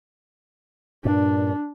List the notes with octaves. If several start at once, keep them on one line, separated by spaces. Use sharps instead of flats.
G2 A#2 D4